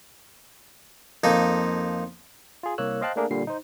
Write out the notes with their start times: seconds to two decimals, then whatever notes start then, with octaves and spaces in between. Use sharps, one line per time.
1.24 F2 A#3 D#4 A4
2.63 F4 G#4
2.78 C2 A#3 C#5 E6 F#6
3.01 C5 D#5 F5 G5 A5 F#6
3.16 A3 A#3 D4 G#4 A#4
3.30 A#2 D3 G3 C7
3.47 D#4 C5